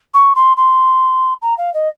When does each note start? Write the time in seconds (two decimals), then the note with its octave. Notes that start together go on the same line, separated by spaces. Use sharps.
0.13 C#6
0.35 C6
0.57 C6
1.41 A#5
1.57 F5
1.73 D#5